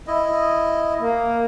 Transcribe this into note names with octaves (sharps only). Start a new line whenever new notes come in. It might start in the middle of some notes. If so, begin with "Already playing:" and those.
E4 D#5
A#3